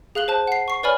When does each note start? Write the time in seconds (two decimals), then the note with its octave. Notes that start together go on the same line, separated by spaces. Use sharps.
0.15 G#4 F5 F#6 F#7 G7
0.28 C5 A5 F#6
0.48 F#5 C7
0.68 C#6 C7
0.83 B4 C#5 D5 G#5 B5 F6